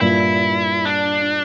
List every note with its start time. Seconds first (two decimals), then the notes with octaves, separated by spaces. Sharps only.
0.01 G2 A#2 E4
0.85 D4